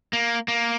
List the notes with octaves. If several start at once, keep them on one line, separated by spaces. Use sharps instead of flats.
A#3
A#3